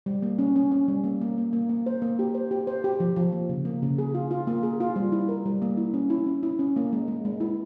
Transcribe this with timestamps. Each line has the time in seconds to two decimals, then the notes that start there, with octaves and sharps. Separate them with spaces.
0.06 G3
0.22 A#3
0.39 C#4
0.56 C#4
0.71 C#4
0.88 G3
1.04 A#3
1.21 A#3
1.38 A#3
1.53 A#3
1.69 A#3
1.86 C5
2.02 A#3
2.19 G4
2.35 C5
2.51 G4
2.67 C5
2.84 G4
3.00 F3
3.16 F3
3.32 A#3
3.49 C#3
3.65 A#3
3.83 C#3
3.98 G#4
4.15 F4
4.31 F4
4.47 A#3
4.63 G#4
4.80 F4
4.96 G3
5.12 E4
5.29 A#4
5.46 G3
5.62 A#3
5.77 E4
5.94 C#4
6.10 E4
6.27 C#4
6.43 E4
6.59 C#4
6.76 A#3
6.93 G#3
7.08 G#3
7.25 G#3
7.40 E4